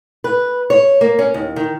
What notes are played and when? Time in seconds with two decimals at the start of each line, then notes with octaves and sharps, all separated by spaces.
0.24 B4
0.70 C#5
1.01 A#3
1.19 C#4
1.34 D#2
1.56 D#3